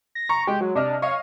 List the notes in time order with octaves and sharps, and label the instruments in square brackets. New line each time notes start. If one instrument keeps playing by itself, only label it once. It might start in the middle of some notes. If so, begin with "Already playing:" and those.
[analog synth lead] A#6
[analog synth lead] A#5 [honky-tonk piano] C#6
[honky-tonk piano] G#3 [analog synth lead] G4
[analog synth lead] F#3
[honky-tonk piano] C3 D#5 F6 [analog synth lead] D4
[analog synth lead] C#5 [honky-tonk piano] D#5 F5